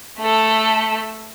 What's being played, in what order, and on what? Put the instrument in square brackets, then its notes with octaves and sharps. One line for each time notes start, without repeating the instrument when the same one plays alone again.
[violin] A3 A4